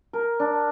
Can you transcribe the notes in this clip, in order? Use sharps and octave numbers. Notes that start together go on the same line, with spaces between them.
A#4
D4